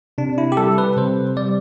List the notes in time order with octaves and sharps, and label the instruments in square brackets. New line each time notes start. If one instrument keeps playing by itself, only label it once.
[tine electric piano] C3 D4
E4
G4
G3 A4
B4
C3 C5
G3 D5